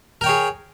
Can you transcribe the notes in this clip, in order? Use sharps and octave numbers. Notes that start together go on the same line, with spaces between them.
G#4 A#4 C#5 G5